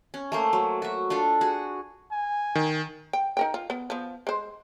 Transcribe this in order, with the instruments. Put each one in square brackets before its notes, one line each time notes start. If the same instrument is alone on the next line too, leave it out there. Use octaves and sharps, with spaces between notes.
[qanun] C#4
A3 A#3 C5
F#3
F#4 E5
D4 F4 A4
F#4 G#4
[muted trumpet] G#5
[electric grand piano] D#3
[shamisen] G5
D#4 A#4 G5
F4
B3
F3 B3
G#3 C5